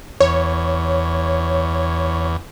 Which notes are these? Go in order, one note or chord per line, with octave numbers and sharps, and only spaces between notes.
E2 C#5